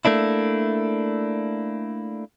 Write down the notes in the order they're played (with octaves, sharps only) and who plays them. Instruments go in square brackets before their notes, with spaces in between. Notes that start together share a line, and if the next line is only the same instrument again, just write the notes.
[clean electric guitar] A3 A#3 D4 E4